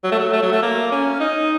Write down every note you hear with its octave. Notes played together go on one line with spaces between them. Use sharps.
F#3
A3
F#3
A3
F#3
A3
A#3
C#4
D#4